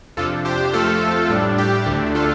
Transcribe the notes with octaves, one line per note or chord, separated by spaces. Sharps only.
F2 C3 F3 D4 F4 A4
G4 C5
F2 F3 A3 C4 F4 A4
A2 G3 D4
G4
D2 D3 A3 D4
F4 A4